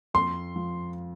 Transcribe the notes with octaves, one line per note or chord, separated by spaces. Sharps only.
F2 C6
F3